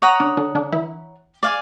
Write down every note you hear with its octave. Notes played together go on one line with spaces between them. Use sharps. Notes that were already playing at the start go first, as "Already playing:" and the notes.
C#5 F#5 A#5 D#6
D3 D4
D3 D4
D3 D4
E3 E4
D5 F5 G#5